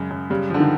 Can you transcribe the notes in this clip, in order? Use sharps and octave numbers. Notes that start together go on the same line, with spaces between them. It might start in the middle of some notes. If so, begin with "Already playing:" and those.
Already playing: F#2 C#3 G#3
F#2
C#3 G3
D3 F3
D#3